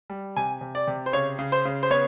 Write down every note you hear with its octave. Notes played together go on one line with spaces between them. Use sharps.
G3
C3 G#5
C3
D5
C3
C5
C#3 C#5
C#3
C5
C#3
C5
B3 C#5